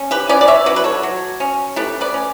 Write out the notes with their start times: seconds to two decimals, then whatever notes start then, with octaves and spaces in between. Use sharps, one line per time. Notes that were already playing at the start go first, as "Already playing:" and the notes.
Already playing: C#4
0.11 G4 B4
0.29 C#4 B4 D5
0.41 D5
0.48 C#5 E5
0.66 F#3 B4 D5
0.76 B4
0.84 A4 C#5
1.03 F#3
1.40 C#4
1.76 A3 G4 B4
2.01 B4 D5
2.14 C#4